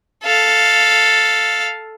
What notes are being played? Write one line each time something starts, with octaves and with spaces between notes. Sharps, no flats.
A4 F5